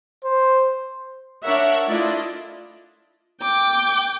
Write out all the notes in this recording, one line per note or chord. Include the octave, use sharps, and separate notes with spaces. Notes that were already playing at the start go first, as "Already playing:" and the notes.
C5
D4 A#4 C#5 E5 F#5
A3 D4 E4 F4 D5 D#5
G5 D6